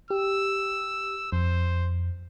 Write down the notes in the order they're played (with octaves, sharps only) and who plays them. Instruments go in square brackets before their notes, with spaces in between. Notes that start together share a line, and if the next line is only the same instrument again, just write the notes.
[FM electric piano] G4 [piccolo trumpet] E6
[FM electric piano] F2 [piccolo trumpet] C5